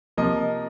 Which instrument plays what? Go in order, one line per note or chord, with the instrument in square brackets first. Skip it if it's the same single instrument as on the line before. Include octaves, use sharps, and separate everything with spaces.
[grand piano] C3 F3 A#3 D#5